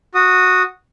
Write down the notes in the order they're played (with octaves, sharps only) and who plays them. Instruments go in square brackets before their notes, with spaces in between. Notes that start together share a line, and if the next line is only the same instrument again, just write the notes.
[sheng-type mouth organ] F#4 D#6